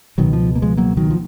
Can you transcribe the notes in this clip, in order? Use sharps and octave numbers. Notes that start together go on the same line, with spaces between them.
C#2 B2 D#3 F#3
F3
A#3
F3 G#3
F#3 A#3
D#3 F#3
F3